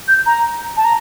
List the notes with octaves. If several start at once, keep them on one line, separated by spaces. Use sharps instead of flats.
G6
A#5
A5
A#5